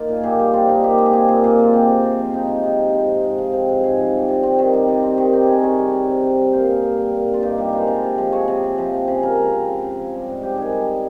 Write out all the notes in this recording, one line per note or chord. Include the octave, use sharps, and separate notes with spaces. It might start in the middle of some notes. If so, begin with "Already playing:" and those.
Already playing: A#3 D#4 F4
A#2
G#4
A#2 G4
G3
C4 F4
A#2 D#4
A#2 G4
G#3
G4
C4 G#4
A#2
A#2
G#3 F4
C4 G4
C3
C3
F3
C4 D#4
C3 D#4
C3 D#4
F3
C4
G#2
G#2
F3
C4
G#2
G#2 G#4
F3
G3
C3
C4
D#3
G3
C3
C4
D#3
C4 G4
C3 G#4
A#4
C3 C#5
G3
C4
C3
C3
G3
A#3 C5
G#4
G2 A#4
G2
G3
A#3
G2
F4
G2 D#4
G3
G#3 A#4 C5
C3
C3
F3
G#3 C#5
C3
C3
F3
C4
C#3
C#3 A#4
F3
C4
C#3
C#3
F3
G3
G#2
G#2 G4
D#3 G#4
G3